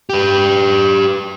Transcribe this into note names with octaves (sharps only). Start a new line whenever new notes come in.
G4 B4